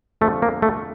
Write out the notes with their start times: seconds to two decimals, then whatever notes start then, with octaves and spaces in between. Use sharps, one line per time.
0.21 F2 D3 F3 A3
0.42 A#3
0.62 A3